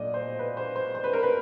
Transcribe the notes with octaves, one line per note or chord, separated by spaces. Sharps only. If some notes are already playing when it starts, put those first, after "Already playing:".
Already playing: A#2 F#3 A3 D5 D#5
C5
B4
C5
C5
C5
B4
A#4
B4